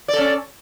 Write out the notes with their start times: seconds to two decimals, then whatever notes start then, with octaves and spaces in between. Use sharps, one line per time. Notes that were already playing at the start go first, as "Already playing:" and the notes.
0.08 D5
0.13 A4
0.18 C#4